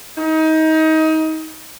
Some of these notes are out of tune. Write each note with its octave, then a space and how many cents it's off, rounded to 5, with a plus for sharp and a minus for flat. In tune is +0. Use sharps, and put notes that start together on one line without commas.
D#4 +25